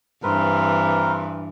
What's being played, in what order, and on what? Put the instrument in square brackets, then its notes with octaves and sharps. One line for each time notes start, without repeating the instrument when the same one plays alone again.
[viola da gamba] G2 E3 [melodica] C4 A#4 B4